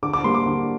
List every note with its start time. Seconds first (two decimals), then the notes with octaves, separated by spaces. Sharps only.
0.03 D3 D6
0.13 D6
0.24 G3 A#3 C6
0.35 D6
0.46 D3